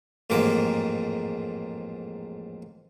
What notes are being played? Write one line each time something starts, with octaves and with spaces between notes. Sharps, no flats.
A1 F2 G#2 A#3 D6